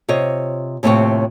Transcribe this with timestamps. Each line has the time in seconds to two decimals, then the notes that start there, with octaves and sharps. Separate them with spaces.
0.09 C3 F4 C#5 D#5
0.83 D#2 A2 C3 C4 F4 C#5